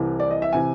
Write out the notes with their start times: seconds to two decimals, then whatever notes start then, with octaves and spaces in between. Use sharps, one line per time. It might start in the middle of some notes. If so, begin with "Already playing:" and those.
Already playing: C2 C3 E3
0.20 D5
0.31 D#5
0.42 E5
0.53 C3 E3 G#5